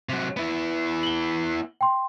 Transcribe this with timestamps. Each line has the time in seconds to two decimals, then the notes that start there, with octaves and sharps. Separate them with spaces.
0.09 C3 F#3
0.37 B3 E4
1.03 F#7 G7
1.81 G5 C6